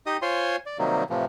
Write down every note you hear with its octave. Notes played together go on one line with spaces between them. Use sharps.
D#4 G4 D#5 D#6
F4 C5 C#5 G#5 C6
D5
C3 D#3 F#3 G3 A#3
A2 C3 E3 F3